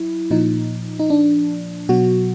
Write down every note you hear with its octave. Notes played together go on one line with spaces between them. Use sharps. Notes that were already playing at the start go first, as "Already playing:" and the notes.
Already playing: F#3 E4
A#2 F3 D#4
D#4
D4
B2 F#3 F#4